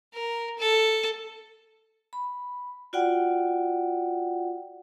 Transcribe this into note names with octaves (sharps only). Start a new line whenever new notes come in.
A#4
A4
B5
F4 F#4 D5 F#5 G5